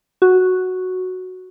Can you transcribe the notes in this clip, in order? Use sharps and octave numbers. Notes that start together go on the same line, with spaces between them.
F#4